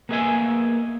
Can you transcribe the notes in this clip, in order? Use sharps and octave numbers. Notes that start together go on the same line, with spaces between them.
A#3 B3 G#4 D#5 E5 G#5